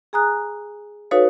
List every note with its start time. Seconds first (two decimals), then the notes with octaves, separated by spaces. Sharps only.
0.13 G#4 G#5 A#5 D#6 F#6
1.11 D#4 F#4 A4 B4 C#5 F5